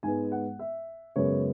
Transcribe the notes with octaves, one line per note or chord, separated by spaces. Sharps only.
G#2 G#3 B3 G#5
F#5
E5
F#2 C#3 G#3 B3 C#5